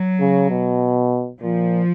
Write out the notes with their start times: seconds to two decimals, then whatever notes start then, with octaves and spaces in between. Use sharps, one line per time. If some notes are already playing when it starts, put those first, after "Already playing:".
Already playing: F#3
0.21 C#3
0.50 B2
1.40 A#2 F3